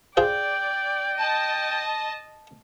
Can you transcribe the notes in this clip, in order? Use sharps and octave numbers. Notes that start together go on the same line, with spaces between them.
F4 G#4 C5 D5 G5
D#5 A5